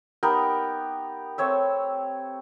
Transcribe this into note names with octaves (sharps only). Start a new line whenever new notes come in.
B3 D#4 G4 A#4
A3 C4 C#5 E5